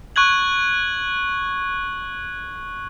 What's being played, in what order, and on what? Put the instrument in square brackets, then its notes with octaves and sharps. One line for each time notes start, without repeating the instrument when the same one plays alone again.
[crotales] C#6 F#6 G#6 F#7